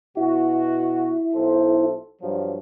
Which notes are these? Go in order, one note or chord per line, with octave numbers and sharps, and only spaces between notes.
B2 E4 F#4
B1 A4 C5
G2 F3 F#3